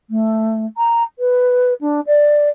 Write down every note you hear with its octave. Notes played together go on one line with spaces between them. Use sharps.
A3
A#5
B4
D4
D5